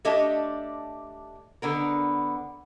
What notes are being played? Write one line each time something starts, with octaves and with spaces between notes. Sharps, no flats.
A3 D4 G4 D#5 A5
D3 B3 A#4